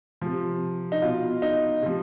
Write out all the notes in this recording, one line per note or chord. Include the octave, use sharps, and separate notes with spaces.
C3 F3
D#4
B2 F4
D#4
C3 F3